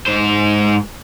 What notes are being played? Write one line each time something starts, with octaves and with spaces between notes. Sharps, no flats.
G#2 C5